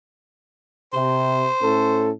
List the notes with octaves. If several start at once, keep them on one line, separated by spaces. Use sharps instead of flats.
C3 C5
A2 C#4 A4